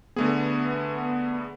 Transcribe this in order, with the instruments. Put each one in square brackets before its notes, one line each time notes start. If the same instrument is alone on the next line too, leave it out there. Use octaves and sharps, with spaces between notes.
[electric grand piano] D3 A3 G#4 [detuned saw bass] B3